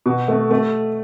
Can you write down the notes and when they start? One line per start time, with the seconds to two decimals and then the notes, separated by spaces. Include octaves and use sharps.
0.06 B2
0.28 A3
0.51 A3